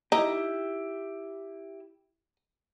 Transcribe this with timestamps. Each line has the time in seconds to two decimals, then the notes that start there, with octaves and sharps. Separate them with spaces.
0.12 D#4 E4 G4